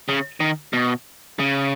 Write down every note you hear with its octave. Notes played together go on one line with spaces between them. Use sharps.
C#3
D#3
B2
C#3